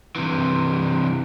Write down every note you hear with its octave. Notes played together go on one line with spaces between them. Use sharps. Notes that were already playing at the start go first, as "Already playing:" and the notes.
C3 E3